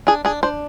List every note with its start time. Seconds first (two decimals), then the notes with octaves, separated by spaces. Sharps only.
0.07 D4 G#4
0.25 D4 G#4
0.43 D4 C5